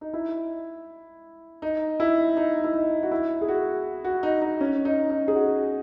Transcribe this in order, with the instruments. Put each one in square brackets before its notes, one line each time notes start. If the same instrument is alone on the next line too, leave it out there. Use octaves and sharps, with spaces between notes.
[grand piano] D#4
E4
D#4
E4
D#4
E4
D#4
F#4
E4
G#4
F#4
F#4
D#4
D#4
C#4
D#4
D#4
G#4
F#4